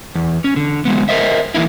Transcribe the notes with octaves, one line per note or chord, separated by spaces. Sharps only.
E2
C#4
D3
F#3 G#3 B3
A#4 C5 D#5 E5
E3 A#3 D#4 E4